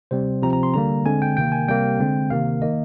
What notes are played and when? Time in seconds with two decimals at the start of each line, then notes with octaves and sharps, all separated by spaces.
0.11 C3 G3 C4 C5
0.42 C3 F3 C4 A#5
0.53 A#5
0.63 C6
0.74 D3 G3 A#3 A#5
1.05 D3 G#3 C4 G#5
1.22 G5
1.37 C3 D#3 A#3 G5
1.52 G#5
1.68 C3 G3 A#3 G5
2.00 D3 G#3 C4
2.30 C3 D#3 A#3 F5
2.62 D#3 A#3 D#5